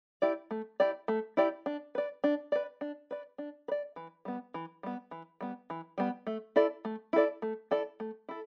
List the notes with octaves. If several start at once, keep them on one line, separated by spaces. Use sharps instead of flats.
E4 G4 D5
A3
E4 G4 D5
A3
E4 G4 D5
D4
B4 D5
D4
B4 D5
D4
B4 D5
D4
B4
D5
E3
G3 B3
E3
G3 B3
E3
G3 B3
E3
G3 B3
A3
E4 A4 D5
A3
E4 A4 D5
A3
E4 A4 D5
A3
E4 A4